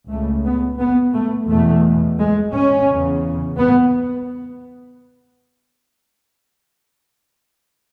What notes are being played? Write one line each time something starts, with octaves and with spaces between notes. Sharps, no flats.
C#2 C#3 A3
B3
B3
A3
E2 B2 A3
G#3
C#4
E2 C#3
B3